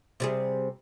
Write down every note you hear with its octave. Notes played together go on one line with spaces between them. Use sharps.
C3 G3 G#4